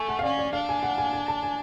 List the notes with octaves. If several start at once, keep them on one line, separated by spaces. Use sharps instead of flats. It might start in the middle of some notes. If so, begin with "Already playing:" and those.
Already playing: A3 G#5
F#5
F5
C#4 D5
D5
D4 F5
G#5
F#5
G#5
G#5
A5
G#5